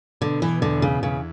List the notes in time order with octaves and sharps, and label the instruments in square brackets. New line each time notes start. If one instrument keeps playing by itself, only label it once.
[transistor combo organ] B2 [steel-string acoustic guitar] D3
[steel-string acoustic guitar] E3
[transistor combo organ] E2 [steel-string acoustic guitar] D3
[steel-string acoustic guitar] C#3
[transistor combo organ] E2 [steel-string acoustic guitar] C#3